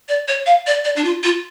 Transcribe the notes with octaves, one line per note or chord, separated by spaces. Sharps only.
D5
C#5
F5
D5
D5
D4
F4
F4